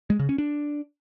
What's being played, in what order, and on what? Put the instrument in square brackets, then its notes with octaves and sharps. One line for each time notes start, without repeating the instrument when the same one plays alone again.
[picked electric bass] G#3
C#3
C#4
D4